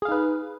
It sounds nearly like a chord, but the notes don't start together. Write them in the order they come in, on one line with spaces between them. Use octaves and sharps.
G#4 F5 D#4 B4